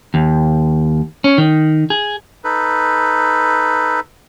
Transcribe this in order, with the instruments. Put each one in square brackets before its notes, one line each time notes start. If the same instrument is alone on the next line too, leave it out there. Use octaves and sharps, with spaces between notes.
[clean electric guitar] D#2
C#4
D#3
G#4
[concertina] D#4 A4 B4